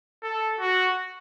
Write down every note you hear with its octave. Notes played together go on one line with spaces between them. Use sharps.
A4
F#4